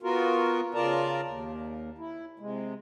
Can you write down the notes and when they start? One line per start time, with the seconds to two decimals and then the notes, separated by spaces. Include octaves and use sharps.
0.03 B3 F4 F#4 A#4
0.74 C#3 F4 A#4 D5 A5 A#5
1.24 D#2
1.98 E4
2.39 C3 G#3